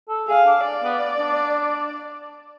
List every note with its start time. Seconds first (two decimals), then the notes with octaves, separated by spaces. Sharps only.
0.09 A4
0.28 G#4 F5
0.47 D4
0.65 D5
0.83 B3
1.20 D4